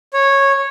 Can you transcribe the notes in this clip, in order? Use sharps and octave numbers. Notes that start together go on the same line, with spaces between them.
C#5